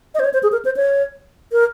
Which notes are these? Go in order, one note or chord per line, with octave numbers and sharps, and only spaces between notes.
D#5
C5
C#5
C5
G#4
A#4
C5
C#5
A#4